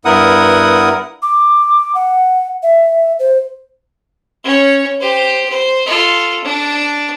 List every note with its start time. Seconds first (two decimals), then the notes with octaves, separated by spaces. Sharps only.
0.05 G2 B3 E4 A#4 F#5 D#6
1.22 D6
1.95 F#5
2.63 E5
3.19 C5
4.44 C#4 C#5
5.00 G4 C5
5.49 C5
5.86 F4 A4
6.44 D4